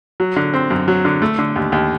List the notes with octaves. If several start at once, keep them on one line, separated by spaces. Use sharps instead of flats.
F#3
D3
C4
F#2
F#3
D3
A3
D3
D#2
D#2